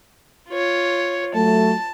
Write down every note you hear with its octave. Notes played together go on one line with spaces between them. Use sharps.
F4 C#5
F#3 A3 A5